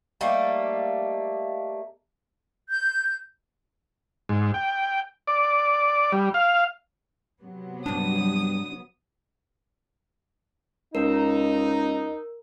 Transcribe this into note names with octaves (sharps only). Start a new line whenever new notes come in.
G3 A3 A#3 D#4
G6
G#2
G5
D5
G3
F5
C3 F#3 B3
G2 G3 D4 D#6
C#2 D#4 A#4